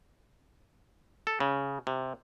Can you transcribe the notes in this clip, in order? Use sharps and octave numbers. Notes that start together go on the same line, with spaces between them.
A4
C#3
C3